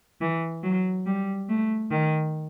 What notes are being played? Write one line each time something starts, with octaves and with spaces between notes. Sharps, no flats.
E3
F#3
G3
A3
D#3